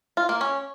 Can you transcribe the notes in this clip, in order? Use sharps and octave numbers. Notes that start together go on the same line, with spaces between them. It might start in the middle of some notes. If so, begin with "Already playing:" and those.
F4
A#3
C#4